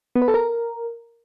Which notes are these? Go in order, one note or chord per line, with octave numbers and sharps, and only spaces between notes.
B3
B4
A4
A#4